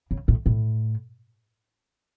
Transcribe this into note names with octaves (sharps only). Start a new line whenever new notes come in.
C#3
A2
A2